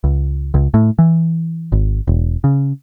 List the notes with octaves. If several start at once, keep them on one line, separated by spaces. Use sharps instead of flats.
C#2
C#2
A2
E3
G#1
E1
C#3